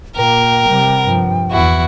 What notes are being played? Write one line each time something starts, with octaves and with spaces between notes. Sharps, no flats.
A#2 A#3 A#4 G5
C3 G3
G2 F3
E2 E4 F#4